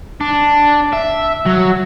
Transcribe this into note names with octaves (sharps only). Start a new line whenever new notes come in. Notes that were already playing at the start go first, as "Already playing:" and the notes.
D4
E5
F#3